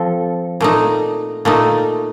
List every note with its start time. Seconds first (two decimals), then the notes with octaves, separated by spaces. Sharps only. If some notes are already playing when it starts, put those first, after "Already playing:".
Already playing: F3 C4 A4
0.60 A#2 A3 D#4
1.45 A#2 A3 D#4